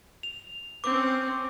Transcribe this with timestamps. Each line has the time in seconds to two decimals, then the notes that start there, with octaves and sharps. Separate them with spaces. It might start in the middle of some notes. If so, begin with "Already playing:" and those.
0.23 F7
0.84 C4 C#4 D6